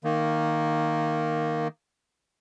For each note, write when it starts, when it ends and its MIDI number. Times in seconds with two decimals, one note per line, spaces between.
0.04 1.68 51
0.04 1.68 58